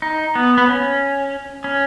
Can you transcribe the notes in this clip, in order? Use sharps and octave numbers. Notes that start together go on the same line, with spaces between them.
D#4
B3
B3
C#4
C#4